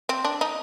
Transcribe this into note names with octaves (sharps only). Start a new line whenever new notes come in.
C4
D4
D#4